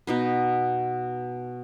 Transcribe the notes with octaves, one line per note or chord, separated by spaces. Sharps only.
B2 D#4 B4